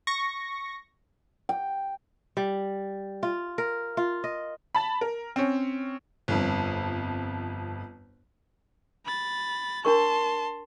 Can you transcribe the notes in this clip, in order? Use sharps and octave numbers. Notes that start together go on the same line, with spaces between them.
C#6 A#6
G5
G3
F4
A#4
F4
D#5
A5 B5
A#4
C4 C#4
G1 F2
B5 A6
D4 A#4 A5 C6 C#6